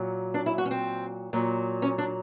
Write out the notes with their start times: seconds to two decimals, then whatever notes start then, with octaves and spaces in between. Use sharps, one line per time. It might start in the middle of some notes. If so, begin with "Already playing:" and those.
Already playing: A#2 F#3
0.34 D4
0.46 E4
0.58 F#4
0.66 C#4
0.71 C4
1.33 A#2 F#3
1.82 C#4
1.98 D4